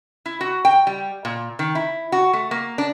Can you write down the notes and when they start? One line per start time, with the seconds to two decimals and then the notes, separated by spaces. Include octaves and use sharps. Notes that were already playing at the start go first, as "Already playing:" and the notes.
0.26 E4
0.41 F#4
0.65 G5
0.87 G3
1.25 A#2
1.59 D#3
1.75 E4
2.12 F#4
2.33 A3
2.51 A#3
2.78 D4